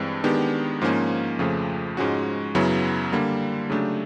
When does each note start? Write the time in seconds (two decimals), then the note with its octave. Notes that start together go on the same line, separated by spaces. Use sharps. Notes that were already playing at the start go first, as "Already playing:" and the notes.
Already playing: G2 E3 G#3 C4
0.24 D#3 G#3 B3 D4 G4
0.81 G#2 F3 A#3 C#4
1.39 F2 C#3 F3 A3
1.97 G#2 F3 G#3 C#4 F#4
2.55 F#2 C#3 F#3 B3 E4
3.13 D3 G3 A#3
3.70 C#3 F#3 A3 D4 G4